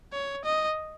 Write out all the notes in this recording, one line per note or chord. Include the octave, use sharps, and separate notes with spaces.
C#5
D#5